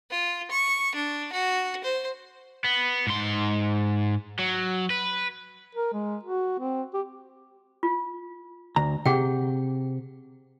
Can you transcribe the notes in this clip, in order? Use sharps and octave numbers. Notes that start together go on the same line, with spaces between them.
F4
C#6
D4
F#4
C5
B3
G#2 C6
F#3
B4
A#4
G#3
F#4
C4
G4
F4
D2 A#5
C3 G4 G#4 F#5 G5